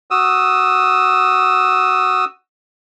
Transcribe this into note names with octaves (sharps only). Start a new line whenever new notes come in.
F#4 D#6 E6